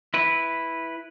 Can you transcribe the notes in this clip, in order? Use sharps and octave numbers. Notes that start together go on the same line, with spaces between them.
E4 B4